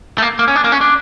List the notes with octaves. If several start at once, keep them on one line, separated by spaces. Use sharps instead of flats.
A3
A#3
A#3
C#4
D4
A#3
C#4
D4